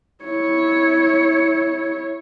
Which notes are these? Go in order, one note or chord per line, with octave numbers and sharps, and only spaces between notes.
E4 C#5